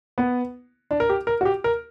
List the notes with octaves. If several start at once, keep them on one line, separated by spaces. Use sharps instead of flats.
B3
D4
A#4
G4
A#4
F#4
G4
A#4